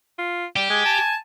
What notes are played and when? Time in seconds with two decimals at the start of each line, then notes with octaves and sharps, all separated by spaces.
0.19 F4
0.56 G3 G4
0.70 G#3 G#5
0.85 A5